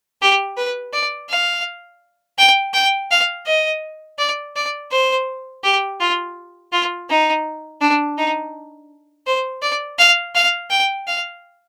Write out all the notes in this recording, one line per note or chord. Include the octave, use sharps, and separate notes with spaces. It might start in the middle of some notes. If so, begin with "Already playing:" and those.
G4
B4
D5
F5
G5
G5
F5
D#5
D5
D5
C5
G4
F4
F4
D#4
D4
D#4
C5
D5
F5
F5
G5
F5